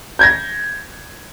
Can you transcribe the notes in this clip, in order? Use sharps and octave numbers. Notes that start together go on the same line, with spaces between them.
G6 G#6 A#6